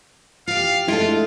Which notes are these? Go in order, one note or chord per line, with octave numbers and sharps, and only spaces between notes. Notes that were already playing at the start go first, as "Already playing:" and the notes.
F4 G4 F5
G#3 A3 D4 E4 F4 A4